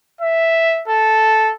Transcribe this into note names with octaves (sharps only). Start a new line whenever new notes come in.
E5
A4